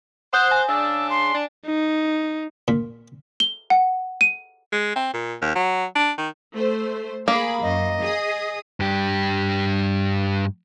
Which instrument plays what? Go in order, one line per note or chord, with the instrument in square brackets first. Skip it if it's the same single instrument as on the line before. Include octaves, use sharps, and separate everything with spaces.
[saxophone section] C5 [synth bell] F#5 D#6 G6 [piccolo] F#6
[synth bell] G#5
[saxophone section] C#3 D4 [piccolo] E6
[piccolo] C6
[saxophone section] D4
[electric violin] D#4
[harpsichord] A#2
[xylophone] G7
F#5
D#7
[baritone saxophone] G#3
C4
A#2
D#2
F#3
D4
D#3
[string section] A3 C5
[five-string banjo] A#3 [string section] G#4 B5
[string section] F#2 [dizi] D#5
[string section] G#4 D#6
[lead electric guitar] G2 G4